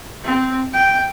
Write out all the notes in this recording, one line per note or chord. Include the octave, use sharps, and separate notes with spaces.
C4
G5